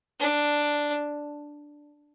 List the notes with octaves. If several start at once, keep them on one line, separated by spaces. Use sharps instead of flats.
D4